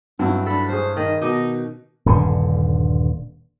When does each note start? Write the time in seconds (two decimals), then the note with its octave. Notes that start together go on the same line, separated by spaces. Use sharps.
0.19 G2 F#3 C4 E4
0.46 D4 A4 B5
0.69 C#4 G#4 C5
0.97 D#3 D#5
1.22 B2 D#4 D#5 D6
2.06 D#1 G2 D3